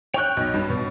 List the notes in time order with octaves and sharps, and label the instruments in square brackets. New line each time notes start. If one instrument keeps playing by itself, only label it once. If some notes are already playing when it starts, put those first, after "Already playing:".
[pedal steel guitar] C#5 F#6 [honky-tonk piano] G5 C#6 G6
[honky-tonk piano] B1
G2
B2